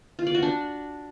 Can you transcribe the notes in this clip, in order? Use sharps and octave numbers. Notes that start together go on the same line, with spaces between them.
F4
D5
F#4
D4